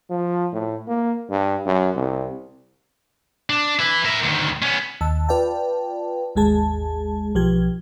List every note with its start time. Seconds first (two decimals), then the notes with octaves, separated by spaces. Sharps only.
0.10 F3
0.53 A2
0.88 A#3
1.31 G2
1.66 F#2
1.96 C2
3.50 D4
3.79 E4 B4
4.05 A#4 E5
4.23 D2 D#3
4.62 B3 C#4
5.01 D#2 A5 E6
5.28 F4 B4 D5 F5 G5 A5
6.36 G#1 D#2 G#3 G#4 A5
7.35 B1 F3 G4 G#6